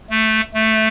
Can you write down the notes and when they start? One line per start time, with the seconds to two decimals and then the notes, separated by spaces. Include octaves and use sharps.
0.10 A3
0.54 A3